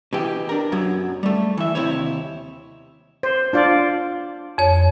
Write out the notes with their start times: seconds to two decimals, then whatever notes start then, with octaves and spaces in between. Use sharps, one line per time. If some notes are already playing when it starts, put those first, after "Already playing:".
0.13 B2 E3 G4
0.49 D4 A#4
0.72 F#2 B2 F#3
1.23 G3 A3
1.57 E3 E5
1.75 D#2 C3 E4 C#5
3.23 C5
3.53 D4 F4 D5
4.58 F2 C#5